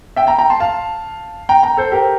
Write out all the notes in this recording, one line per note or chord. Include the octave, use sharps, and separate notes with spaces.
E5 G5
G5 A#5
G5 A#5
A5 C6
F5 A5
G5 A#5
G5 A#5
A4 C5
G4 A#4